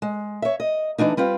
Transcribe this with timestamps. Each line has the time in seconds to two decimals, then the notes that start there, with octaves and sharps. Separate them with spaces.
0.02 G#3
0.42 C#5 E5
0.60 D#5
0.98 E3 A3 D4 D#4
1.17 G3 C4 F4 B4